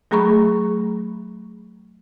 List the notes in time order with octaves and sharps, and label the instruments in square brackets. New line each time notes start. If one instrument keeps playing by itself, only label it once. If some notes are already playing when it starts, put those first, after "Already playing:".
[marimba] F#3 A3 G#4 A#5 B5 C#6